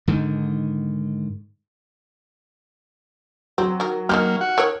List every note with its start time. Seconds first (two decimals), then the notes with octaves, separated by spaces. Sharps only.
0.07 G#2 D3 D#3
3.58 F#3 C4
3.80 D#3 A#4
4.09 D#3 F#3 G#3 A#3 G4 F6
4.41 F#4 F#5
4.58 D#3 A#4 C#5